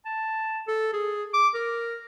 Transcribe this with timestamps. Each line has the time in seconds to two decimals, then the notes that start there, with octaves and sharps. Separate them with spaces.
0.05 A5
0.68 A4
0.93 G#4
1.34 D6
1.54 A#4